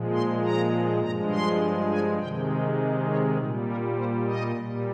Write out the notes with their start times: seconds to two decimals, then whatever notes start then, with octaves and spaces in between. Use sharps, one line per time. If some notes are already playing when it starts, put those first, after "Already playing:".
Already playing: A#2 F3 G#3
0.13 C6
0.43 A#5
1.01 G2 F3 G#3 A#5
1.31 C6
1.91 G#5
2.19 C3 D#3 G#3 G5
3.08 C#5
3.37 A#2 G3 G#4
3.67 A#4
3.96 C5
4.25 D#5
4.56 A#2 G3